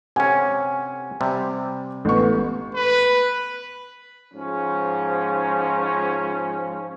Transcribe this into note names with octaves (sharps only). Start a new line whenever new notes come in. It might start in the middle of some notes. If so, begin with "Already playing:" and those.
C3 C#4 F#5 G#5
C3 G3
A1 B3 C#6
B4
G#2 F3 C#4